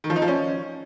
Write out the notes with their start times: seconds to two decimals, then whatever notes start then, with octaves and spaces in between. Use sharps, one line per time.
0.04 D#3
0.10 F3
0.16 D#4
0.22 F3
0.28 C#4